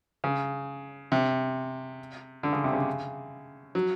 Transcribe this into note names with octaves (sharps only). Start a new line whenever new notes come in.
C#3
C3
D3
C#3
C3
C#3
F#3